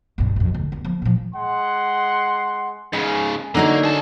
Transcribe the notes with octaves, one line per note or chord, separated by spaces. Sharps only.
B1 G2
B1 F2
D2
E2
F3 A#3
A#2 F3
G#3 F#5 C6
G#2 C#3 G#3
D3 F#3 A#3 D4 D#4 C#5
G#4 A5